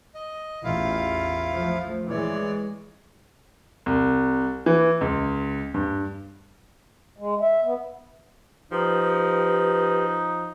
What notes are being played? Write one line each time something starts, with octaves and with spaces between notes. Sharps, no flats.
D#5
A1 E2 E4 F4 F5
F3 A3
E3 G#3 C#5 D5
C2
E3
C#2
G2
G#3
E5
B3
F3 D#4 G4 B4